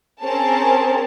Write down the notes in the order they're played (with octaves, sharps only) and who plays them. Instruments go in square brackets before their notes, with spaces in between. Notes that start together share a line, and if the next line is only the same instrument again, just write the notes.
[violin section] C4 C#4 G#4 A#4 A5